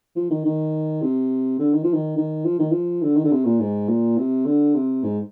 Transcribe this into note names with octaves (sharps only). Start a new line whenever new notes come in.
F3
D#3
D#3
C3
D3
D#3
F3
D#3
D#3
F3
D#3
F3
D3
D#3
D3
C3
A#2
G#2
A#2
C3
D3
C3
G#2